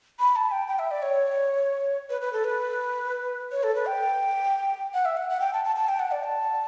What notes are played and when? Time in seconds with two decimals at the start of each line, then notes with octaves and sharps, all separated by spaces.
0.19 B5
0.36 A5
0.51 G5
0.68 G5
0.79 E5
0.91 D5
1.02 C#5
2.10 B4
2.21 B4
2.33 A4
2.44 B4
3.51 C#5
3.63 A4
3.75 B4
3.87 G5
4.94 F#5
5.05 E5
5.17 F#5
5.29 F#5
5.40 G5
5.53 A5
5.65 A5
5.76 A5
5.88 G5
5.99 F#5
6.11 D5
6.23 A5